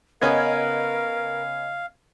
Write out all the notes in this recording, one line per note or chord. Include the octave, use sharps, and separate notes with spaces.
C#3 B3 C#4 A#4 B4 D#5 F5 G#6